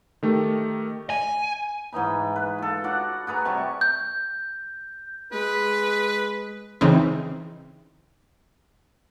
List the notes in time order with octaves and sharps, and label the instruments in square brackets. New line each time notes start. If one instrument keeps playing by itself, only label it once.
[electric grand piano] D#3 A3 G4
[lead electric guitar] G#5
[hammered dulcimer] G#2 E3 D#4 B5
B4
F4 A4
F#4 D5 F#5
F#4 G#4 B4 A#5
C3 G3 A5 C#6
[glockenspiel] G6
[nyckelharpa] G#3 [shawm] B4
[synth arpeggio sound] C#3 E3 C4 D#4